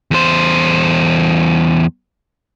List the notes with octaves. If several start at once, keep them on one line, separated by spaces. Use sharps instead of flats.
E2 C5